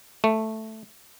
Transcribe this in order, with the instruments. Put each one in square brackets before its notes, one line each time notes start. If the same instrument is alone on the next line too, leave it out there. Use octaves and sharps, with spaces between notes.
[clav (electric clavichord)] A3